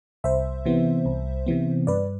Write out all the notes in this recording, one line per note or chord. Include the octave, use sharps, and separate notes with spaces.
C2 C5 E5
C3 E3 B3
C2
C3 E3 B3
G2 B4 D5